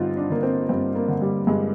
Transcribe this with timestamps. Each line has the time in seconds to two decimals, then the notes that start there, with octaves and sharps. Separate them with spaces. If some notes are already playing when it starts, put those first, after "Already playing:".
Already playing: G2 D3 C4 D#4 F4
0.17 D4
0.30 D3 A#3
0.43 C4
0.69 G2 C4
0.95 A#3
1.08 D3
1.22 G3
1.47 G2 G#3